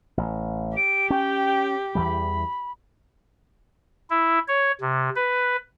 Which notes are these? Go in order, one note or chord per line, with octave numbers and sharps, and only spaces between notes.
A1
G4 D7
C#4 G5
E2 E3 G3 B5
E4
C#5
C3
B4